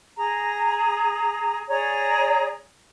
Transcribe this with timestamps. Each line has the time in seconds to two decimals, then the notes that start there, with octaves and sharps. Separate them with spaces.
0.17 G#4 A#5
1.69 G#4 C#5 D5 A#5